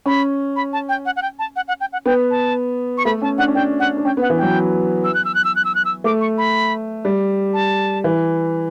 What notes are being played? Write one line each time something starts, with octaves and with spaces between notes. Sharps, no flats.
C#4 B5
B5
A5
G5
F#5
F#5
G5
A5
F#5
F#5
G5
F#5
B3 G5
A5
C#6
A3 B5
C#4 A5
D4 F#5
C#4
D4 G5
F#5
D4
C#4 G5
B3
F#5
E3
F#3 G5
E6
F#6
E6
F#6
E6
F#6
E6
F#6
E6
A3 D6
C#6
B5
G3
A5
E3